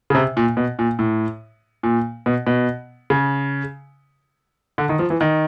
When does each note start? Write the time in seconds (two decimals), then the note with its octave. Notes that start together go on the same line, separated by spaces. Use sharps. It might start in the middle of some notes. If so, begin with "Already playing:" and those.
0.10 C#3
0.15 C3
0.37 A#2
0.57 B2
0.79 A#2
0.99 A2
1.83 A#2
2.26 B2
2.47 B2
3.10 C#3
4.78 D3
4.89 D#3
4.99 F3
5.10 E3
5.21 D#3